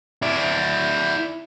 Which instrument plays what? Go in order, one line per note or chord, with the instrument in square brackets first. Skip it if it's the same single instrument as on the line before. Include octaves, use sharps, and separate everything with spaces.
[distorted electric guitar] E4 D5